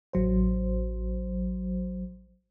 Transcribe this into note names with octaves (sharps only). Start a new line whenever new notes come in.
A1 F#3 C5